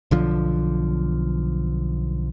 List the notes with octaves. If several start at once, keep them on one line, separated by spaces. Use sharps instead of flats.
B1 D3 F3